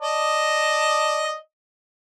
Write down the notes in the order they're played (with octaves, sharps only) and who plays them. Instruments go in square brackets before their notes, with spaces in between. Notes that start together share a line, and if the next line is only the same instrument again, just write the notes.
[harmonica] D5 D#5 A5